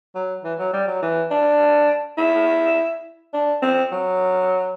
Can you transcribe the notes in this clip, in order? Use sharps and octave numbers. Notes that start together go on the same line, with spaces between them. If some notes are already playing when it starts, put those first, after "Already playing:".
F#3
E3
F#3
G3
F#3
E3
D4
E4
D4
C4
F#3